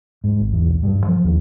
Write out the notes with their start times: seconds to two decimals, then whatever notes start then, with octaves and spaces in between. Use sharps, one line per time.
0.24 G#2
0.39 G#1
0.52 E2
0.68 B1
0.83 G2
1.08 F3
1.24 D#2